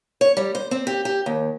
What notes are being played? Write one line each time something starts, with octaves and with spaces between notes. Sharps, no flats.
C#5
G3
C5
C4
G4
G4
D#2